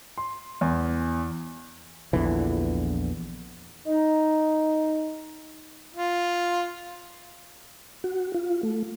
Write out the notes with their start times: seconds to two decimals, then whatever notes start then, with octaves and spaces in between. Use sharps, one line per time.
0.18 C6
0.61 E2
2.13 A#1 E2 D3 E3
3.87 D#4
5.94 F4
8.04 F#4
8.34 F4
8.63 A3